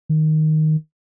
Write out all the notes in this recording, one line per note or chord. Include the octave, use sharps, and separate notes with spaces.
D#3